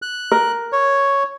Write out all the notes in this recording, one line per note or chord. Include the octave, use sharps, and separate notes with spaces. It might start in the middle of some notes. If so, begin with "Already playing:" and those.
F#6
A#4
C#5